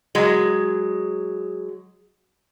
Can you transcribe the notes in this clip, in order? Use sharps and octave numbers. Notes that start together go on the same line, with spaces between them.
F#3 G#3